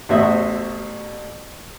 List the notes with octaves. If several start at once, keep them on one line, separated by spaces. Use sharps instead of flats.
A1 E2 F#4 C5 E5 D#6